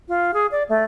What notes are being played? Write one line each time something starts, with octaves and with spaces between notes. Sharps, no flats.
F4
G#4
D5
A3